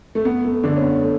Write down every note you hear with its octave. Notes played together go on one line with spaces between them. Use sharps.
A3
B3
A3
D3 D4
C#4
B3
A3